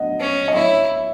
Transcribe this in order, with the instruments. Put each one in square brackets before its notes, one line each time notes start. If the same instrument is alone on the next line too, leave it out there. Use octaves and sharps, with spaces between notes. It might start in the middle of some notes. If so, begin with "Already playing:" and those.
Already playing: [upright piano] D#5 F#5
[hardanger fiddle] C#4
[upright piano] D#5
[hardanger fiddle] E4 [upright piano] C#5 E5